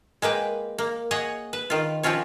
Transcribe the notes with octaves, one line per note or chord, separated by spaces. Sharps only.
G#3 A#3 B4 G5
A#3
G#4 C#5 D#5 F#5
B4
D#3 F4
F3 C4 C#4 F4 C#5